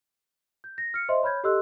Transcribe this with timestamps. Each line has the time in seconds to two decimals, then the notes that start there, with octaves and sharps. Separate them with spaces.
0.64 G6
0.78 A#6
0.94 F6 C#7
1.09 C5 D#5 E5 C6
1.23 C#5 B5 F6 G6 G#6
1.44 G4 A4 D#5 C6 E6 F#6